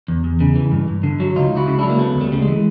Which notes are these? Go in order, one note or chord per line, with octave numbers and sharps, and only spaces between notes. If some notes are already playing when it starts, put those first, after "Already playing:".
E2
E2
C#3
E3
G2
G2
D3
F#3
C#2 D#4 F4
C#2 E4 F#4
C#3
F#3 D4 E4
A#3
D2 A3 B3
D2
G3 A3
C#3 G3
G#3
E3